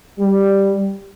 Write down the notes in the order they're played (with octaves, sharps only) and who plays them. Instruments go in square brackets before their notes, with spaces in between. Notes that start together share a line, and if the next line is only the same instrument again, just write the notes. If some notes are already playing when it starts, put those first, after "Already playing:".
[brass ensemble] G3